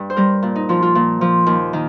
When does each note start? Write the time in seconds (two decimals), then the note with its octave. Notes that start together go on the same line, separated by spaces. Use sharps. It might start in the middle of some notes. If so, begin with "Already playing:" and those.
Already playing: G2
0.10 C5
0.17 G3 A#4
0.43 A#2
0.56 D#4
0.69 F3 F4
0.82 F4
0.95 A#2
1.21 F3
1.46 D#2
1.73 D#3